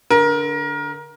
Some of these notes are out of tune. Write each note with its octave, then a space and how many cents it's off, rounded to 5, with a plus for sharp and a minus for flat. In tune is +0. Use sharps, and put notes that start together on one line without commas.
D3 -15 A#4 +25